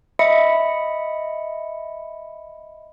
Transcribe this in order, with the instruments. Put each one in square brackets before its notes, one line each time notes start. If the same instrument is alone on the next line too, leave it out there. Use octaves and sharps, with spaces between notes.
[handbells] D#5 E5 B5 C#7